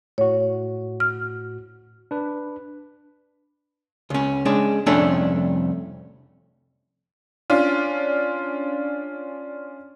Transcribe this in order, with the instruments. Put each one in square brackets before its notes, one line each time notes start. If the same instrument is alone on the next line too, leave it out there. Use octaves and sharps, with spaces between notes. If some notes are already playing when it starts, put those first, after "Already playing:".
[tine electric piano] A2 F#4 [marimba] C#5
[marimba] F6
[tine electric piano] D4 B4
[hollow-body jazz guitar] C#2 C#4
G#3 C#4 D4
C2 F2 A3 C#4 D4
[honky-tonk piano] C#4 D4 F4